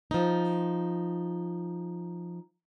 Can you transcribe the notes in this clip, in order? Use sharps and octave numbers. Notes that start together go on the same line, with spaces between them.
F3 D#4